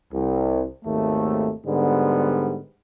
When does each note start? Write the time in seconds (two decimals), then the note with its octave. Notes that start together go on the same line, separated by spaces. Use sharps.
0.12 C2
0.85 G#1 D#2 A3
1.65 G#2 D3 G3 B3